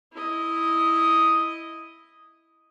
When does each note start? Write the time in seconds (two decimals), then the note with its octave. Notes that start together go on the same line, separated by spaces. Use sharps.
0.13 E4 D#5